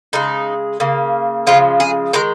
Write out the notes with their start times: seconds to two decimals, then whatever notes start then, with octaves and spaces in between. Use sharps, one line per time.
0.13 C#3 G#3 D#4
0.80 C#3 A#3
1.47 C#3 F3 G#3 F4
1.80 G#4
2.13 D#3 G#3 A#4